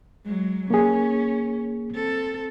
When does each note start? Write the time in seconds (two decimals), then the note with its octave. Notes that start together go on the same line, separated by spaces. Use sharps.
0.24 F#3 G#3
0.71 A#3 C#4 G#4
1.92 C4 A4